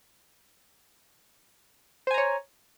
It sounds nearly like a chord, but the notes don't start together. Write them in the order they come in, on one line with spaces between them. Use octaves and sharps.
C5 G#5 A#5 C#5